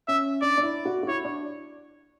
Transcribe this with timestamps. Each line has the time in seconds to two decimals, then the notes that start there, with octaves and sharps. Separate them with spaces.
0.08 C#4 E5
0.42 D4 D5
0.57 D4
0.63 E4
0.85 F#4
1.03 F#4
1.08 E4 C#5
1.24 D4